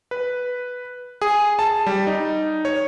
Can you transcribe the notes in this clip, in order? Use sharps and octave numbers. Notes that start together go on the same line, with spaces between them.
B4
G#4
A5
G3
D#4
C#5